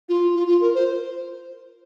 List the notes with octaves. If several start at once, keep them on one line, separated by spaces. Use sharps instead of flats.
F4
F4
F4
A#4
C5